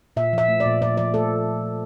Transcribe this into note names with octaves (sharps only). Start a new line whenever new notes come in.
A#2 E5
F3 E5
A3
D5
A#2
A#2 D5
F3 D5
A3 A4